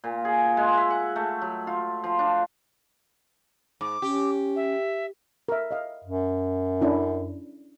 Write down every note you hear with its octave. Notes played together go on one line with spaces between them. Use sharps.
A#2
G#4
G#3
E5
F#5
A3
F#3
F4
F3
D4
G#2 D6
C#4 G4
E5
A#4 E5
D#5 F5
F#2
C#4 D4 E4